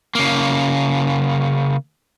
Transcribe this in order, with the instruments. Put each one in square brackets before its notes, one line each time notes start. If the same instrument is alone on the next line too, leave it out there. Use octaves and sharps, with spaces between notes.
[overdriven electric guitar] C#3 A#3